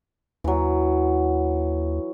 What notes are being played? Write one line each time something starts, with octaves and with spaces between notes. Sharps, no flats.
D#2 E3 F#3